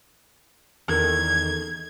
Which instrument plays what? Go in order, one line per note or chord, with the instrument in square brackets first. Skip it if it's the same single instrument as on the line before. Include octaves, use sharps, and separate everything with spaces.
[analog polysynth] E2 D#3 A4 [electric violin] G#6